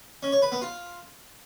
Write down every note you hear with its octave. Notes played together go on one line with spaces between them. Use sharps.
C#4
C#5
B4
B3
F4